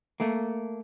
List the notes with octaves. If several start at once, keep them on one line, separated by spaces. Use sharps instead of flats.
A3 A#3